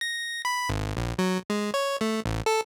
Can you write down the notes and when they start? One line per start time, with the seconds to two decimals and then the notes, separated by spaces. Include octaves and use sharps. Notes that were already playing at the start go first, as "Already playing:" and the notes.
0.01 A#6
0.45 B5
0.69 G#1
0.97 A#1
1.18 F#3
1.50 G#3
1.74 C#5
2.01 A3
2.26 A1
2.46 A4